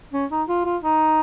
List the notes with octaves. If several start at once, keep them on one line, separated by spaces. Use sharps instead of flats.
C#4
D#4
F4
F4
D#4